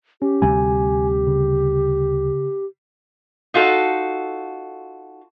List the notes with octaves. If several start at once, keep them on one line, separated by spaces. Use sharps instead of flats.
C#4 G4
D2 C3 G3 G#5
C#3
D#4 F4 F#4 A4